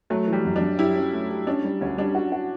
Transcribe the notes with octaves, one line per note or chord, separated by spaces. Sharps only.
F#3 A3
E3
G3
F#2
D4
F#2
E4 G4
C#4
A3
G4
C#4 D4
G3
D2 C#4
G3 D4
F#4
F#4